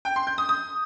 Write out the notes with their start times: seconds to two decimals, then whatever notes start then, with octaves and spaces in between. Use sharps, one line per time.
0.05 G5
0.16 C6
0.27 G6
0.38 D#6
0.49 D#6